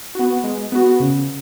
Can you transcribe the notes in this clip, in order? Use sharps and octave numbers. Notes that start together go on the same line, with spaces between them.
B3 F#4
G#3
B3 F#4
C#3